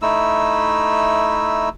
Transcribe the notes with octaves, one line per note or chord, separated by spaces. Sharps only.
A3 D#4 E4 E6